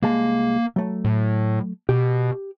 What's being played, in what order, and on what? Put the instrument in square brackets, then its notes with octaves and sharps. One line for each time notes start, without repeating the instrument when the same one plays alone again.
[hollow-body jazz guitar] C2 G#3 A5 [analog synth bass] A#3
[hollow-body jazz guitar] F#3 A3
[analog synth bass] A2
[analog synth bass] B2 [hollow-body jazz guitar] G4